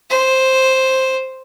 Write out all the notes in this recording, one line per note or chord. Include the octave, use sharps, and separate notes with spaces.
C5